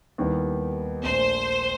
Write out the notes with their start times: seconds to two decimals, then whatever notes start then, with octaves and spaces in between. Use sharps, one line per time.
0.18 D#2 D#3 G3 B3 E4
1.03 A#1 A#2 F3 A3 C5